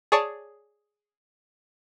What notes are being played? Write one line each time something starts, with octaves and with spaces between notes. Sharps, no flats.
G#4 C#5 D5 A5